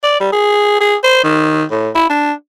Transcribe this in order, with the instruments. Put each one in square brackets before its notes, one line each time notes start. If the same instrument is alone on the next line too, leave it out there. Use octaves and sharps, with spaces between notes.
[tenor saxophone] D5
G3
G#4
G#4
C5
D#3
A2
E4
D4